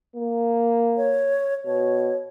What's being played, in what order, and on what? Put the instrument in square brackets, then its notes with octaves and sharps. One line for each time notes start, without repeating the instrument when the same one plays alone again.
[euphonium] A#3
[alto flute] C#5
[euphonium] B2 [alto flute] C#5